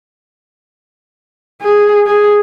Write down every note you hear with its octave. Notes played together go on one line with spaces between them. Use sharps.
G#4
G#4